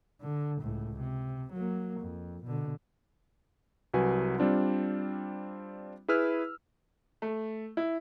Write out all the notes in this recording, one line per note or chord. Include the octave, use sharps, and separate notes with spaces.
D3
C#2 A2
C3
F#3 A#3
F2
B2 D3
C2 F#3 F#4 B4 G#5
G3 C4 D4 F4
E4 G#4 B4 E6 F6
A3
E4